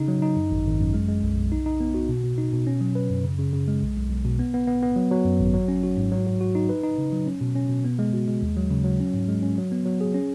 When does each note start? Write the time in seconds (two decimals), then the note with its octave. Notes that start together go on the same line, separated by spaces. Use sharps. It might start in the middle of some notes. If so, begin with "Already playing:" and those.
Already playing: C#3 D#4
0.08 F#3
0.22 D#4
0.36 F#2
0.51 G#1
0.66 G#1
0.79 F#2
0.94 G#3
1.08 G#3
1.23 B1
1.37 B1
1.52 D#4
1.66 D#4
1.80 B3
1.94 F#4
2.09 B2
2.23 B2
2.38 D#4
2.52 B2
2.67 C#4
2.81 F#3
2.95 B4
3.10 F#2
3.24 C#3
3.38 C#3
3.53 C#3
3.68 G#3
3.82 B1
3.96 B1
4.11 B1
4.25 B2
4.39 B3
4.54 B3
4.67 B3
4.83 B3
4.96 F#3
5.11 F#3
5.25 F#2
5.40 G#1
5.54 F#3
5.68 C#4
5.83 F#4
5.97 G#2
6.12 F#3
6.27 F#4
6.41 F#4
6.55 D#4
6.69 B4
6.83 D#4
6.98 C#3
7.12 F#3
7.26 C#4
7.41 B2
7.55 C#4
7.70 B2
7.84 B3
7.99 G#3
8.13 F#4
8.28 G#3
8.42 D#2
8.57 F#3
8.71 C#3
8.85 F#3
9.00 C#4
9.14 G#2
9.28 G#3
9.42 C#4
9.58 F#3
9.72 B3
9.85 F#3
10.01 G#4
10.15 C#4